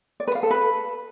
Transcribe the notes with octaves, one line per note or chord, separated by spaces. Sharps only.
D5
B4
F5
A4
B4